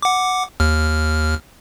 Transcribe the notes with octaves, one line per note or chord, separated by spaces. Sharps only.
F#5 D6
D#2 F6